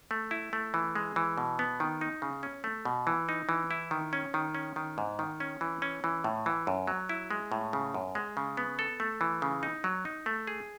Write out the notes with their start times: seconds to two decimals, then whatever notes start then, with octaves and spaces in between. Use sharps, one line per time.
0.11 A3
0.31 E4
0.53 A3
0.74 E3
0.95 G#3
1.16 E3
1.38 B2
1.59 B3
1.80 D#3
2.01 D#4
2.22 C#3
2.43 C#4
2.64 A3
2.85 B2
3.07 E3
3.29 D#4
3.49 E3
3.71 E4
3.91 D#3
4.13 C#4
4.34 D#3
4.55 C#4
4.76 D#3
4.98 G#2
5.19 D#3
5.40 C#4
5.61 E3
5.82 C#4
6.04 E3
6.24 A2
6.46 E3
6.67 F#2
6.87 F#3
7.09 E4
7.31 G#3
7.52 A2
7.73 C#3
7.94 F#2
8.15 G#3
8.37 C#3
8.57 B3
8.79 A4
9.00 A3
9.21 E3
9.42 C#3
9.63 D#4
9.84 F#3
10.05 D#4
10.26 A3
10.47 G#4